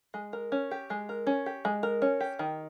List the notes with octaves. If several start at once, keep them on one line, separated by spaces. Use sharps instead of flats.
G#3
A#4
C#4
G4
G#3
A#4
C#4
G4
G#3
A#4
C#4
G4
D#3